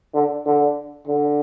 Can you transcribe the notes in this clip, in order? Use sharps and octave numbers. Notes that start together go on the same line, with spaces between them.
D3
D3
D3